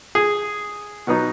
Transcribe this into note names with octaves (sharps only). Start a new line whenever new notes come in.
G#4
B2 F#3 B3 D#4